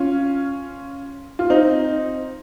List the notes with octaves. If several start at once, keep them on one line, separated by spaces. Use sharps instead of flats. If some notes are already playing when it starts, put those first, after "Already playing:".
Already playing: C#4 F4
F4
C4 D#4